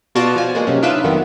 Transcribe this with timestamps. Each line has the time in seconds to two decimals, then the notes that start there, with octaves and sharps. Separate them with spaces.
0.15 B2 F4 F#4 D5 A5 A#6
0.36 F3 G#5
0.55 G#3 A#3 F#4
0.67 C3 F#3 C#4
0.83 D4 D#4 F4 B4 E5
1.04 F2 D#3 F#3 B3